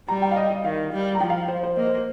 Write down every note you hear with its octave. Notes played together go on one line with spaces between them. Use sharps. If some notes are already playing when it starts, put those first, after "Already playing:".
G3 A#5
G5
F5
D#5
D#5
D#3 F5
G3
A#5
F3 G5
F5
C5
C5
A#3 D#5
C5